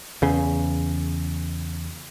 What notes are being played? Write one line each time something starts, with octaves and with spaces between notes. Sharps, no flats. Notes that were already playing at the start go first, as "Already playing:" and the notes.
E2 C#3